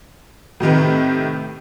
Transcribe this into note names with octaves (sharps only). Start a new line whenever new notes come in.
A2 C3 D#3 B4